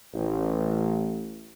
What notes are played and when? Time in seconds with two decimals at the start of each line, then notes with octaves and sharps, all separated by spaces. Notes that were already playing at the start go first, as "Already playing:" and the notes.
0.14 A1